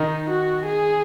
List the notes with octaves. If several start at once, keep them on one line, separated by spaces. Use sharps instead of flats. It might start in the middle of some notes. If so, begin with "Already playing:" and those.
Already playing: D#3 D#4
F#4
G#4